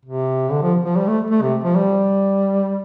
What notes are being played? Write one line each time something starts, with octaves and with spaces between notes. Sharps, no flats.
C3
D3
F3
F3
G3
A3
A3
C3
F3
G3